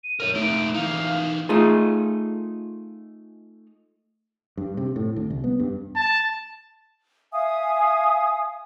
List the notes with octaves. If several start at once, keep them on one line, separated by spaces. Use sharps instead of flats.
D#7
A#4 C#5 D#7
A3 D#4 D7
E3 D#4 F5
A3 D#4 F4 G#4 A4
G2
C3
A2
D2
C2
B3
G2
A5
E5 F5 G#5 D#6